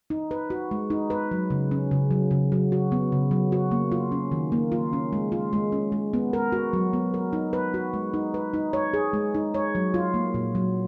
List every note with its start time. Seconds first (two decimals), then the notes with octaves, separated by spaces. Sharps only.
0.10 D#4
0.31 B4
0.50 F#4
0.71 G#3
0.90 D#4
1.10 B4
1.31 F#3
1.50 C#3
1.71 C#4
1.91 C#3
2.11 F#3
2.31 C#3
2.52 F#3
2.72 F#4
2.92 B3
3.12 C#3
3.31 F#3
3.52 F#4
3.71 A#3
3.92 F4
4.12 C#4
4.32 D#3
4.52 A#3
4.72 F4
4.93 C#4
5.13 G#3
5.32 F4
5.53 G#3
5.72 C#4
5.92 G#3
6.13 B3
6.33 A#4
6.52 F#4
6.73 F#3
6.93 B3
7.14 A#4
7.33 D#4
7.53 B4
7.74 F#4
7.94 G#3
8.14 D#4
8.34 B4
8.54 D#4
8.73 C#5
8.93 G#4
9.13 G#3
9.35 D#4
9.54 C#5
9.75 F#3
9.94 F4
10.14 A#3
10.34 A#2
10.55 F#3